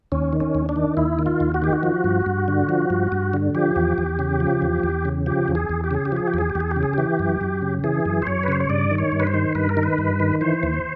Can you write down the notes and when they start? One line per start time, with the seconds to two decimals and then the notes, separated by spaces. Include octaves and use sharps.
0.12 D#2 C#4
0.33 D#3
0.40 C#4
0.55 D#2
0.69 D4
0.76 D#3
0.97 D#2 E4
1.19 D#3
1.26 F4
1.40 D#2
1.54 F#4
1.62 D#3 G4
1.73 F#4
1.83 F3
2.04 G2
2.26 G2
2.48 D3
2.69 F3
2.90 G2
3.12 G2
3.34 D3
3.55 F3 G4
3.76 E2
3.98 E2
4.19 C#3
4.40 F3
4.62 E2
4.83 E2
5.05 C#3
5.26 F3 G4
5.48 E2
5.55 G#4
5.69 E2
5.84 G4
5.91 C#3 G#4
6.05 G4
6.12 F3 G#4
6.27 G4
6.34 E2 G#4
6.50 G4
6.55 E2
6.60 G#4
6.71 G4
6.76 C#3
6.83 G#4
6.93 E3 G4
7.19 F#2
7.41 F#2
7.62 C#3
7.84 E3 G#4
8.05 F#2
8.22 C5
8.27 F#2 C#5
8.43 B4
8.48 C#3 C5
8.61 C#5
8.70 G2 D5
8.91 D#3
8.98 C#5
9.12 G2
9.20 B4
9.27 C5
9.34 D#3
9.55 G2 B4
9.69 A#4
9.77 D#3
9.83 B4
9.98 G2
10.20 D#3
10.41 E3 C5
10.63 D#2